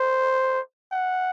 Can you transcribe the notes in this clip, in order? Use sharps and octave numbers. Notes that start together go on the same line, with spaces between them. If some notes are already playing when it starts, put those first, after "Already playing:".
Already playing: C5
F#5